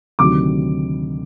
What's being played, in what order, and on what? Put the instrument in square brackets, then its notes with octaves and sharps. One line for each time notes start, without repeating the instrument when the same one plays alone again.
[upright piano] D2 C3 D#3 F#3 D6